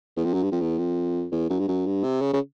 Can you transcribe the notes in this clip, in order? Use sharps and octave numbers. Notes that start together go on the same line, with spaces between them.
E2
F2
F#2
G2
F2
E2
F2
E2
F#2
G2
F#2
G2
C3
C#3
C#3